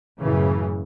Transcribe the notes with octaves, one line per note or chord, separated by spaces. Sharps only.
F#2 A2 C#3 E3